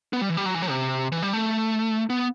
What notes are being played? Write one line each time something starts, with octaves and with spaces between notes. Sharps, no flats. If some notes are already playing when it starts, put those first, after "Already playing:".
B3
G3
E3
G3
F#3
E3
F#3
C3
E3
G3
A3
B3